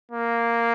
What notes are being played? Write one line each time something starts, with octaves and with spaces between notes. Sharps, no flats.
A#3